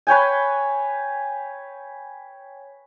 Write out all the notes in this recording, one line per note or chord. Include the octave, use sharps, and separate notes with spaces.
B4 C#5 G5 G#5